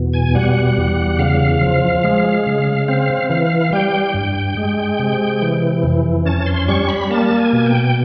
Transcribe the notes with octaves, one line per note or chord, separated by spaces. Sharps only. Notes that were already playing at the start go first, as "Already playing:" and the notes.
Already playing: E2 B2
G#5
G3 F#5
E2
C#3 F5
F3
G#3
C#3
C4 F5
E3 F5
G3 G5
G2
G#3
C3
E3
F2
C#4 A5
C6
G3 C#6
B5
A#3 A5
G#5
B2
G5